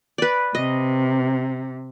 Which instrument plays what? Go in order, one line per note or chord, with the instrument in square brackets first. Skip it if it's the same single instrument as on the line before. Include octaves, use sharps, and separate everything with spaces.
[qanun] B4 D5
[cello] C3 [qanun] D#5